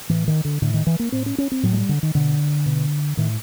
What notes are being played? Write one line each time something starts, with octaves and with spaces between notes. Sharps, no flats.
A2 E3
D#3
D3
A2 D3
D#3
E3
A#3
A2 C4
C#4
C#4
C4
A2 F#3
G#3
G3
D3
D#3
B2 D3
B2
A2 D#3